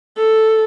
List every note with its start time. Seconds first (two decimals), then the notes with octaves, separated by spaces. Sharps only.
0.18 A4